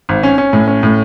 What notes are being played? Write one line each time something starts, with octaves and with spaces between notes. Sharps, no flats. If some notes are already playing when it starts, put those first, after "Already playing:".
G#1
C#4
C#4
A2
C#4
A2